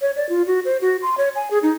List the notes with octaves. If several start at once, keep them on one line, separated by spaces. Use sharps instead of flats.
C#5
D5
F4
F#4
C5
F#4
C6
C#5
G#5
G#4
D#4